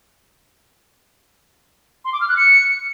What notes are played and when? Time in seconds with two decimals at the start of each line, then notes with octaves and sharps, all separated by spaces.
2.05 C6
2.13 D6
2.21 F6
2.29 F#6
2.37 C#7